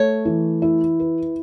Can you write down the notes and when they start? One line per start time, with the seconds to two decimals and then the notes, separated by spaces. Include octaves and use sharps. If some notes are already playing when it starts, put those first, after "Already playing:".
Already playing: A3 C#5
0.25 E3
0.62 E4
1.00 B4